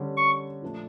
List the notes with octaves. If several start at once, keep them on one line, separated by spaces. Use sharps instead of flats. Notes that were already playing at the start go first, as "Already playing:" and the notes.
Already playing: D3 G3 C#4
C#6
A#2 F3 A3 D4